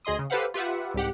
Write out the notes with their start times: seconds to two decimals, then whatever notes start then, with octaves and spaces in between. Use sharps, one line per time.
0.05 D2 G#4 D#5 C6 D#6
0.19 C#3
0.30 G4 A4 B4 C5 F5 F#5
0.54 F4 G4 B4 E5 F#5
0.94 C2 G#2 G4 F#5